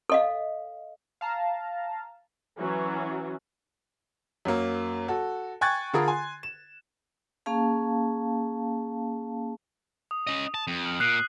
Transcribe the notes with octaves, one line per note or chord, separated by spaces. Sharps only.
A4 D#5 F5
F5 A5 A#5
E3 F#3 C#4
F#2 F#3 A#3
F#4 A4
G5 G#5 C#6 F#6 G#6 A6
D3 F4 G#4 A#4 B5 D#6
G#5 C6
E7
A#3 C#4 G#4 F5 A5
D#6
C#4 D#5
A5
F2 D#7
F6 F#7
A#2 F#6 C7